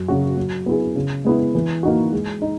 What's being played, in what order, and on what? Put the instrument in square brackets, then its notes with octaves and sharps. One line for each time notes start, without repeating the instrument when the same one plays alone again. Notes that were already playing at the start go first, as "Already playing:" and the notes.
Already playing: [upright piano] F#2
C#3 F#3 C#4 F#4
F#3
B3 E4 G#4
C#3
G#3 B3 E4
E3
A#3 D#4 F#4
G#3
D#4